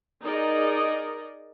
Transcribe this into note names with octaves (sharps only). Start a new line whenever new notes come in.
D#4 G#4 A#4 D5 D#5